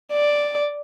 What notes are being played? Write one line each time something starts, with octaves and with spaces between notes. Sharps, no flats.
D5